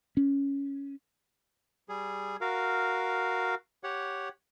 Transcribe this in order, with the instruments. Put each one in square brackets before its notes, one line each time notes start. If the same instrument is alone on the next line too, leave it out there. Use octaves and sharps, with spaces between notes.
[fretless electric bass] C#4
[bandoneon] G3 G#4
F#4 A#4 F5
G4 C#5 F#5